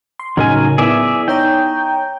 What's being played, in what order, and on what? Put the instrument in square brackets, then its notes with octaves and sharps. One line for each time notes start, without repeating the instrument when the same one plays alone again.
[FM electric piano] C6
[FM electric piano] A2 C#3 D#4 [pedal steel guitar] F#3 A#4 G#5
[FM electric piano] B3 E4 [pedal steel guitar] G#4 D5 E5
[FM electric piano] D#4 C#5 A#5 [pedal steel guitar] G5